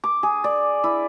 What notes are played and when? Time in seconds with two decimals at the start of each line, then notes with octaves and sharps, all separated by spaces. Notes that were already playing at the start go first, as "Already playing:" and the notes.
0.04 D6
0.23 G#4
0.44 D5
0.84 E4